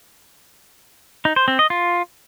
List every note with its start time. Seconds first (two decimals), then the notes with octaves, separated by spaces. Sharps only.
1.25 D#4
1.36 C5
1.48 C4
1.59 D#5
1.70 F4